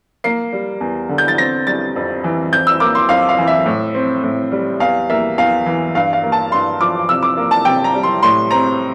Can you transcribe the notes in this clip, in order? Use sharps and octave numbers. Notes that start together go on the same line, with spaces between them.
A#3 C7
G3
E2
D3
G6
A6
C4 A#6
G3 A6
F2
E3
F2 G6
E6
A#3 D6
C6
F2 F5
F5
E3
E5
A2
C4
A2
G3
E2 F5
A#3 E5
E2 F5
E3
G2 F5
F5
A#3
A5
G2 C6
F3 D6
C3 E6
D6
A#3
A5
C3 G5
A#5
G3
C6
A2 C6
C4 A#5